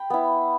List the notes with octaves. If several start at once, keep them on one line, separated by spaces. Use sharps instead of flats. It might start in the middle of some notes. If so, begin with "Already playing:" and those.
Already playing: G5 B5
B3 E4